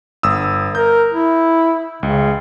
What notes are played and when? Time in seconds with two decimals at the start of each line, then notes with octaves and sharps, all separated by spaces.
0.23 G1 D#6 E6
0.75 A#4 G6
1.13 E4
2.03 C#2 C#3